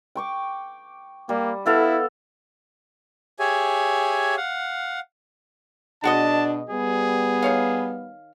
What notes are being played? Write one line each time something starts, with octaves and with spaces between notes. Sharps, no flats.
G5 C#6 D6
G3 A#3
B3 E4 A4 F5
G4 G#4 C#5 E5 G#5
F5 F#5
B2 G#3 D4 F#4 D#5 A5
G3 B3 G#4
D#3 C#5 F5